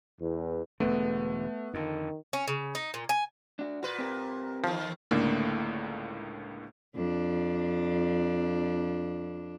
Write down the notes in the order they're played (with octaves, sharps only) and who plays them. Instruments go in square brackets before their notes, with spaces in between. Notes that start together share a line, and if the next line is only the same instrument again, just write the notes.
[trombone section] E2
[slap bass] E1 D3 [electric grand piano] A3 [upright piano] B3
[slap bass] F2 D3 [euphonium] D#3
[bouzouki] C#4
C#3
D#4
A#2
G#5
[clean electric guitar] D4 F#4
[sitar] A#2 B4 [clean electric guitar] F#4
[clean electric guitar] C4 G4 A#4
[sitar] E2 D#3 [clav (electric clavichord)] F3
[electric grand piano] C#2 A2 D3 A3 A#3 D4
[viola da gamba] F2 D4